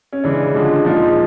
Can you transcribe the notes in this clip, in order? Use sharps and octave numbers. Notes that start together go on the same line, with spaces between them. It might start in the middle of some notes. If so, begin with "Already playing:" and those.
C#4
C#3 E3 G#3 D4
D3 F3 G#3
A#2 F3 G#3 D#4